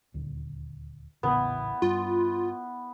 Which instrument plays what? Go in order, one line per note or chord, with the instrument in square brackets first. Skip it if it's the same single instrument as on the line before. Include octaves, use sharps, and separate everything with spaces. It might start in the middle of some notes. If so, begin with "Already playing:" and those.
[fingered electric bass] D#1 D2
[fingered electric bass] D#1 A1 C#3 [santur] B3 E4
[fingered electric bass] G2 [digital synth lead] F4